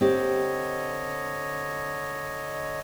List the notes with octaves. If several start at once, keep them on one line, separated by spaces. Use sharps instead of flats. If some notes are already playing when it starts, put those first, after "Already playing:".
D3 C4 G4 C#5 D#5